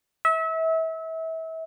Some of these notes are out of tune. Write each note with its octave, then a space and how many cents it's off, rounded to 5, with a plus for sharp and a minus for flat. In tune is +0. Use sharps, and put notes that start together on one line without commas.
E5 -30